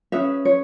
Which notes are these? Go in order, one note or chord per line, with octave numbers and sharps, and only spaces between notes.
C#4 G#4 B4 E5
C#5